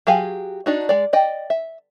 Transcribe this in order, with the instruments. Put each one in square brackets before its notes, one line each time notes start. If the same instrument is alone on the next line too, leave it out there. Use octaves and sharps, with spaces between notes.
[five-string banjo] F#3 G4 G#4 F5 G#5
D4 D#4 F#4
G#3 D5
D5 D#5 G5
E5